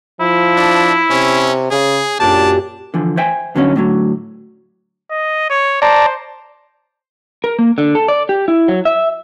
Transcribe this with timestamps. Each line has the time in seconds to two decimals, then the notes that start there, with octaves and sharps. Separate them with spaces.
0.20 F3 E4
0.57 D4
1.11 C3 C#4
1.71 C#3 G#4
2.20 F#2 A#2 D4 G4 A5
2.94 D3 E3 F3
3.17 C5 E5 G5 G#5
3.55 G2 D3 F#3 A#3 C#4 D#4
3.76 A2 D3 F#3
5.11 D#5
5.50 C#5
5.82 C5 D5 A5 A#5
7.44 A#4
7.59 A#3
7.78 D3
7.95 A4
8.08 D5
8.29 G4
8.48 E4
8.68 F#3
8.85 E5